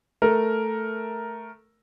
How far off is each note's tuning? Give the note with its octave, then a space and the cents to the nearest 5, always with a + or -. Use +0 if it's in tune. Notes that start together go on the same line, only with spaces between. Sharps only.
A3 +0 A#4 +0